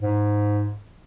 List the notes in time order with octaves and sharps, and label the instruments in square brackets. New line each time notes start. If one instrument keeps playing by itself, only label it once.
[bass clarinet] G#2